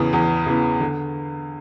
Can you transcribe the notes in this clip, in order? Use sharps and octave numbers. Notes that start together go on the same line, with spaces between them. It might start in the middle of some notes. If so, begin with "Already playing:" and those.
Already playing: E2 C#3 E3 B3
E2
C#3 E3 B3
D3